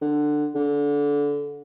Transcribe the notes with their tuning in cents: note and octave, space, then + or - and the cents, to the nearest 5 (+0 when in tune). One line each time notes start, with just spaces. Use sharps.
D3 +15
D3 -20